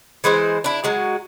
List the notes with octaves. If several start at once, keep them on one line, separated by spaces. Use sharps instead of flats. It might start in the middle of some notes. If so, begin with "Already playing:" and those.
E3 G#3 E4 C5
D4 E4
F#3 G#3 F#4